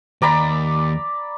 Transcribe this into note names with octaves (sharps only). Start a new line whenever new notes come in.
D#2 D5 A#5 B5